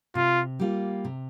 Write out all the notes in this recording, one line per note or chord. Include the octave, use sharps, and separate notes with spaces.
C3 F4
G3 A#3 F4
C3